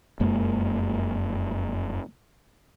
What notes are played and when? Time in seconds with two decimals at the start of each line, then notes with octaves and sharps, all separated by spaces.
0.20 F1 F#2 G#3 A#3